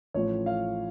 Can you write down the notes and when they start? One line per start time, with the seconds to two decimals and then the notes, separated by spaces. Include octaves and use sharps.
0.14 A1 A2 F3 C#5
0.46 F5